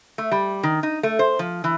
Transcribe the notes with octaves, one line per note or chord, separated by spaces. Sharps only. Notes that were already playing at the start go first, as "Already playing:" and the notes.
A3
G3
D#3
D#4
A3
C5
F3
E3